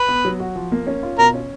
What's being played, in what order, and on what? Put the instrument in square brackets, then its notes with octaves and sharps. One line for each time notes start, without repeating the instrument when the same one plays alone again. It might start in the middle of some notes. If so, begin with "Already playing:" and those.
Already playing: [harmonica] B4
[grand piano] B3
F#3
F#4
F3
A#3
C#4
F4
[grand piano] B2 [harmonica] A#4
[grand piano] C#4